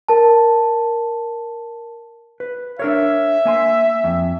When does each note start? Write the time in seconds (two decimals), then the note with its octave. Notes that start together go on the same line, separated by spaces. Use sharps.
0.08 A#4 A5
2.40 B4
2.79 D4 A#4 C#5 E5
3.45 A#3 G#5 C6
4.04 F2